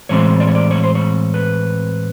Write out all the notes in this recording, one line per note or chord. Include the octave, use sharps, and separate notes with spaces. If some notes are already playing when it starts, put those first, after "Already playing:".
A2 E3 G#3 C4 C#5
D5
C#5
D5
C#5
C5
C#5
B4